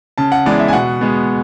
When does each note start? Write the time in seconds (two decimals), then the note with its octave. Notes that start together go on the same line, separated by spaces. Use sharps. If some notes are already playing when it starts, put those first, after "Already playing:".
0.18 C#3 A5
0.32 F#5
0.46 E3 G#3 B3 D5
0.60 E5
0.68 G#5
0.73 B2 F#5
1.01 G#3 B3